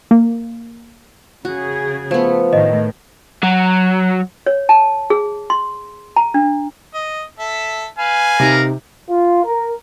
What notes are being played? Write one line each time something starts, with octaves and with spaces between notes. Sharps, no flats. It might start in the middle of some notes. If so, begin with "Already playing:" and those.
A#3
C#3 F#4 G#4
F3 A3 B3
A2 D#3 D#5
F#3
C#5
A5
G#4
C6
A#5
D4
D#5
A4 E5
B4 F5 G#5
C3 D#4 G4 A#4
F4
A#4